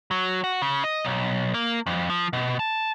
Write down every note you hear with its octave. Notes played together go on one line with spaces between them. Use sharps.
F#3
F#4
C#3
D#5
B1
A#3
F2
F3
B2
A5